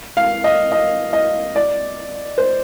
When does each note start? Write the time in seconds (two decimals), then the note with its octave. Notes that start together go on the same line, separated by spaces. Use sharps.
0.17 F5
0.44 D#5
0.72 D#5
1.13 D#5
1.56 D5
2.38 C5